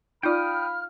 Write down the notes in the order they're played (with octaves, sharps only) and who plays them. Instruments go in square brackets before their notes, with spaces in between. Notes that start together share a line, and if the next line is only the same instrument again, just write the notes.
[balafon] D#4 F4 D5 [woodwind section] F5 F6 [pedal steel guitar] G5 D#6 [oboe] B5